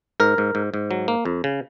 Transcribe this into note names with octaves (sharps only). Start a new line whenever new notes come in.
G#2 A#4
G#2
G#2
G#2
F#3
A#3
F2
C#3